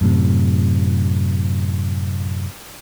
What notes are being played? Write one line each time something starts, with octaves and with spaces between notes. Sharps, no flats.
F#2 A2 C3